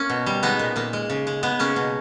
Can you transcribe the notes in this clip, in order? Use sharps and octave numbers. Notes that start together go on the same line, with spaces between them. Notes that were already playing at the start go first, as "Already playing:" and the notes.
Already playing: A#3 C#4
B2
G3
G#3 B3 D#4
A#2
A#2 A#3
G#3
C#3
G#3
G#3 B3
C#3 A#3 C#4
B2